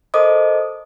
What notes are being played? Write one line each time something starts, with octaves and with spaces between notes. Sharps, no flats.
A4 A#4 C5 D#5 D6 D#6